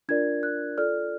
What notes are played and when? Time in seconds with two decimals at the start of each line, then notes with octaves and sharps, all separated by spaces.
0.09 D4 F4 A#4 D5 G#6
0.43 F#6
0.78 F4 A4 D5 F6